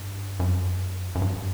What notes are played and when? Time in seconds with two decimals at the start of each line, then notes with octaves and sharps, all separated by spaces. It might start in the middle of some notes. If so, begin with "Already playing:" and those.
Already playing: G2
0.40 F#2
1.15 F#2
1.22 G2